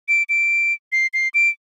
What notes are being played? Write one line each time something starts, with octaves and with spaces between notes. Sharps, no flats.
D7
D7
C7
C7
D7